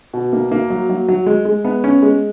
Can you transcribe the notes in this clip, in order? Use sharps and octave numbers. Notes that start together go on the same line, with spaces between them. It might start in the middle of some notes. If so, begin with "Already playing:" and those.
B2
A#3
A#3
F#3
F#3
F#3
G#3
G#3
B3
C#4
G#3